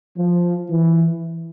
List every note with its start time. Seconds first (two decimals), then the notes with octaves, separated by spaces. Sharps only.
0.17 F3
0.70 E3